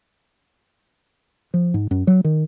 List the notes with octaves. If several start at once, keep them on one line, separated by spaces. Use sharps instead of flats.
F3
G#2
F#2
F#3
D#3